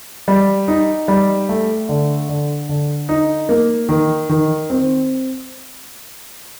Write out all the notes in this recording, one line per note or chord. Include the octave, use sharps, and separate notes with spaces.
G3
D#4
G3
A3
D3
D3
D3
D#4
A#3
D#3
D#3
C4